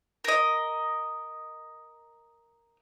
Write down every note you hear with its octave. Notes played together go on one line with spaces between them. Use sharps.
A#4 D#5